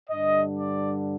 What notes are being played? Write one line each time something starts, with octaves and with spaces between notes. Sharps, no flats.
G2 D3 G3 D4 D#5
D5